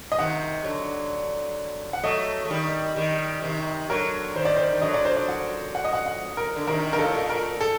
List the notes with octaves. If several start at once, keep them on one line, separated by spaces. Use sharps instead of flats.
D#5
C3 D#3 F#5
D3 F#3
F#5
F#3 A3 D#5
A3
D#3 G3
D#3 G3
C3 D#3
D3 F#3 A#4
D#3 G3 C5
D5
C5
D#3
D3 F#3 D#5
D5
C5
D5
F#5
F#5
D#5
F#5
F#5
A#4
D3
C3 D#3 A#4
G2 A#4
A2 A4
A#2
A#4
A4